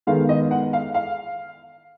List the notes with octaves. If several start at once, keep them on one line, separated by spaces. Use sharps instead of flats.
D#3 G#3 B3 F5
D#5
F#5
F5
F5